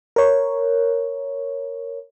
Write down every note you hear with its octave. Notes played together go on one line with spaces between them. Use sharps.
A#4 C#5